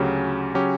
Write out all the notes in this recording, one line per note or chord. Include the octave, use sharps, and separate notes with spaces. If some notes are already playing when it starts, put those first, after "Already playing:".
Already playing: D2 C#3 F#3 C#4 G4
C#3 F#3 C#4 G4